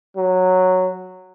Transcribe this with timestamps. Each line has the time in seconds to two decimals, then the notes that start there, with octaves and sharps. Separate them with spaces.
0.17 F#3